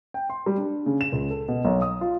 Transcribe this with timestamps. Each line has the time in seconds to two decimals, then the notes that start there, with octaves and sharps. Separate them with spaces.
0.14 G5
0.30 C6
0.46 G3
0.58 D4
0.86 C#3
1.01 E7
1.12 C#2
1.30 A4
1.48 B2
1.65 B1
1.82 D#6
2.01 F4